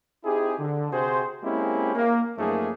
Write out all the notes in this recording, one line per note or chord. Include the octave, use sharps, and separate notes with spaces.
C4 D#4 E4 G4 G#4
D3
C3 F#4 G#4 C5
G#3 A#3 C4 C#4 E4 G4
A#3
F#2 F3 A3 A#3 D#4 G#4